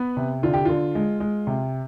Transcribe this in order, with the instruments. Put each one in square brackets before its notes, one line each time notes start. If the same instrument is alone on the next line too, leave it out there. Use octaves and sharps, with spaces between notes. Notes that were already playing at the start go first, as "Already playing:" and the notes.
Already playing: [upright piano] B3 B4
C3
D3 F4
G4
D3 F4
G#3
G#3
C3